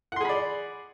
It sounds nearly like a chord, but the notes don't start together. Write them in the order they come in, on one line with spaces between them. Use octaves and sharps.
F#5 C6 G#4 B5 D5